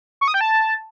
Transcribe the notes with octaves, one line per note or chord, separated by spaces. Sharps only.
C#6
D#6
G5
A5